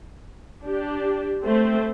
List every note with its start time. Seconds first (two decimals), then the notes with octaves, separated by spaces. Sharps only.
0.64 D4 G4
1.41 A3 C4 C5